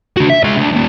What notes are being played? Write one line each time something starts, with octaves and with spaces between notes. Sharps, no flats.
D3 F#4
E5
G#3 C#5
D2
D#2 A#2